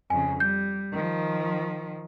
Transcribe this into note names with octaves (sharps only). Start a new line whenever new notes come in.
F2 C#3 G#5
G3 G6
D#3 F3